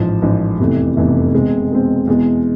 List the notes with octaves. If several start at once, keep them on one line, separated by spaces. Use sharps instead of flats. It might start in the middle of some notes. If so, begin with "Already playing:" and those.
Already playing: A1 G#2 F3
A1 G#2 F3
F1 E2 C3 E3 A3
F1 E2 C3 E3 A3
B2 G#3 C4
B2 G#3 C4
E2 B2 G#3